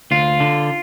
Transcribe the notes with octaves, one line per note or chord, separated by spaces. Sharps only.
D2 F4
D3